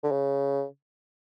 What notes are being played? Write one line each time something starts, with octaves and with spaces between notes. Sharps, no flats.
D3
C#3